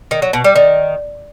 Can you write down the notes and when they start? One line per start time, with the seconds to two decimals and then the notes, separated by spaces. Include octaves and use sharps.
0.11 D#3
0.22 F#3
0.33 B2
0.44 G3
0.56 D#3